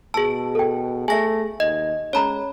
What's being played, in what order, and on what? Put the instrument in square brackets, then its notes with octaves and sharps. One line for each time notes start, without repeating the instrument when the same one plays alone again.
[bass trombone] B2 [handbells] G#4 A5 [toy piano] E6
[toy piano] A4 G5
[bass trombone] A3 [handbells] G#4 A#6 [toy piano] E5 G#5
[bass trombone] D#2 [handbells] D#5
[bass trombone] G#3 [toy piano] C#4 A#5 [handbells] C#5 B5